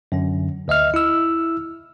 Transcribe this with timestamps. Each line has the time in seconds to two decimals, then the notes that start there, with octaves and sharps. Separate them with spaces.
0.12 F#2 D3 C#4
0.68 D2 D#5 E5 F6
0.94 E4 E6